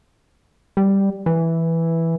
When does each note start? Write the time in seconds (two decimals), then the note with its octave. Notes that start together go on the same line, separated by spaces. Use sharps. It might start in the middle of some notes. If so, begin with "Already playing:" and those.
0.77 G3
1.26 E3